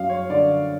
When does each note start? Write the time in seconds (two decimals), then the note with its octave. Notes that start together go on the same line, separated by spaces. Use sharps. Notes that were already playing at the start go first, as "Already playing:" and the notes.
Already playing: F#2 F#3 F5
0.09 C#5
0.30 D3 D5